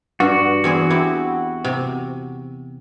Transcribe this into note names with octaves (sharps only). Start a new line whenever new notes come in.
G2 F#4
E2 C4 G#4
C4 E4 G4
C3